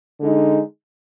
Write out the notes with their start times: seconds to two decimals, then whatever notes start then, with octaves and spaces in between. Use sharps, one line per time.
0.19 D3 G#3 D#4